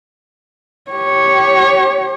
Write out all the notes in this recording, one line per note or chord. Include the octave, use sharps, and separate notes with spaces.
G4 C#5